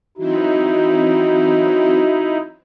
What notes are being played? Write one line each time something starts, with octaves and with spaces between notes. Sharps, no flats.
E3 F#3 C4 D#4 E4 F#4